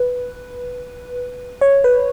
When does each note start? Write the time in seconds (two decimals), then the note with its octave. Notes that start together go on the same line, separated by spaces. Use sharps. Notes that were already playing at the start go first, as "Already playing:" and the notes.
Already playing: B4
1.61 C#5
1.84 B4